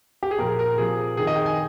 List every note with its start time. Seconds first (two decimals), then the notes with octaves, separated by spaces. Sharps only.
0.23 G4
0.31 G#4
0.38 A#2 F3 A#4
0.59 A#4
0.78 C3 F3 G#4
1.17 C3 D#3 G#4
1.27 D#5
1.36 G5
1.46 G#5